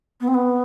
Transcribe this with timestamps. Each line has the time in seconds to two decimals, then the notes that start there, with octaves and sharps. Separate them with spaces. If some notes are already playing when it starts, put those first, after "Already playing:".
0.20 B3
0.27 C4
0.34 B3